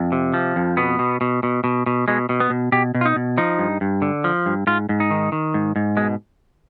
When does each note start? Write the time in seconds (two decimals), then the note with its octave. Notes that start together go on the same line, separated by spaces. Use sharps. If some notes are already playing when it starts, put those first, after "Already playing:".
Already playing: F2
0.12 C3
0.34 F3
0.56 F2
0.77 B2 B3
0.99 B2
1.21 B2
1.43 B2
1.64 B2
1.86 B2
2.08 B2 G#3
2.29 B2
2.40 B3
2.50 B2
2.72 B2 G4
2.94 B2
3.01 F4
3.06 D#4
3.16 B2
3.38 F3 D#4
3.59 G2
3.81 G2
4.02 D3
4.24 F3
4.46 G2
4.67 G#2 F4
4.89 G#2
5.00 D#4
5.11 D#3
5.32 D#3
5.54 G#2
5.76 G#2
5.97 B2 G#3